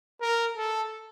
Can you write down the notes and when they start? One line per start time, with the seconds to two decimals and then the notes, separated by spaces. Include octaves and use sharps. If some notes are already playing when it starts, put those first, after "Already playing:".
0.21 A#4
0.57 A4